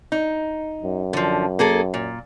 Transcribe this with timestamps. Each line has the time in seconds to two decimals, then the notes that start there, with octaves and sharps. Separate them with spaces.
0.12 D#4
0.83 F#2
1.13 D3 F3
1.59 A#3 G#4 A4
1.94 A#2